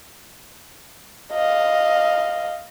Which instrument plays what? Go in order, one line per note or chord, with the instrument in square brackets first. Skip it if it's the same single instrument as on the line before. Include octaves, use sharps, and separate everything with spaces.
[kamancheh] D#5 F5